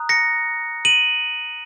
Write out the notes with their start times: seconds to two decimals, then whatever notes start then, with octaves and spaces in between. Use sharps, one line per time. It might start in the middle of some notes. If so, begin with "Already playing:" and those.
Already playing: A#5 D#6 F#6
0.09 A#6 C#7
0.85 D#7 F#7